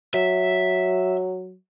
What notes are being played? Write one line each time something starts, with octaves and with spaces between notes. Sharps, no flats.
F#3 E5